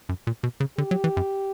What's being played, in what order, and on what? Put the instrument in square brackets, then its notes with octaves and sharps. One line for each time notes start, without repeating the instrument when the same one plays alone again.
[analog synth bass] F#2
A#2
B2
C#3
[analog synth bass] D3 [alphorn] G4
[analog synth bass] F#3
E3
F#2